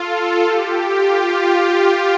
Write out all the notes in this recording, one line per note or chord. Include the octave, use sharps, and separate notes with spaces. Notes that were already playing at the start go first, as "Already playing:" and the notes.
Already playing: F4 A4
G4
F4